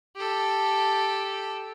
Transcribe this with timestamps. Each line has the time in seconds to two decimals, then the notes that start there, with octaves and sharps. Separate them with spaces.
0.16 G4 A4